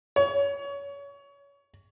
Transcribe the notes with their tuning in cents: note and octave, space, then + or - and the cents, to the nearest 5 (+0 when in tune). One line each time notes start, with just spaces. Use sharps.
C#5 +25